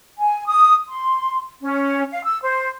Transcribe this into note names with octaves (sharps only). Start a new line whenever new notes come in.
G#5
D#6
C6
C#4
F5
E6
C5